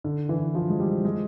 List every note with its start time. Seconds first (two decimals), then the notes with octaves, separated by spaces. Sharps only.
0.04 D3
0.29 E3
0.55 F3
0.69 G#3
0.80 G3
1.05 G#3